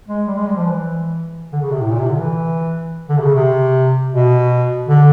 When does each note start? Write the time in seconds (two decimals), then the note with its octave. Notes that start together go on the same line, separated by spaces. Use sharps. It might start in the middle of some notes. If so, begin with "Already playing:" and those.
0.08 G#3
0.27 G3
0.37 G#3
0.46 G3
0.56 F3
0.65 E3
1.53 D3
1.62 C#3
1.72 C3
1.81 A2
1.91 A#2
2.00 C3
2.10 D3
2.19 E3
3.09 D3
3.18 C3
3.22 C#3
3.35 C3
4.12 B2
4.89 D3